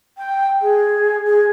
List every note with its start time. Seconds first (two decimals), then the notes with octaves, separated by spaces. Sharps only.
0.18 G5
0.62 G#4
1.26 G#4